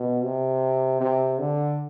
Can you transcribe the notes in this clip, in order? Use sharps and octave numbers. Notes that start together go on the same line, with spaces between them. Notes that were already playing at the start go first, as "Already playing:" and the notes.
Already playing: B2
C3
C3
D3